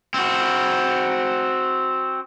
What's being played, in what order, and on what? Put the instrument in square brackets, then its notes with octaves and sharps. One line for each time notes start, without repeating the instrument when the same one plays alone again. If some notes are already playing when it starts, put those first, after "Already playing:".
[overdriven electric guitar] C4 F#4